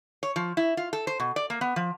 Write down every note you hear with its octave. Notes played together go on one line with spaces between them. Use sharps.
C#5
F3
E4
F4
A4
C5
B2
D5
A#3
B3
F3